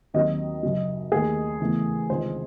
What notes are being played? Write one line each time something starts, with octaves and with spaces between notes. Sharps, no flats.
D#2 D#3 F#3 C4 D#5
F#2 C#3 F#3
D#2 D#3 A3 G#4
E2 C#3 E3 A3
C#2 C3 D#3 C5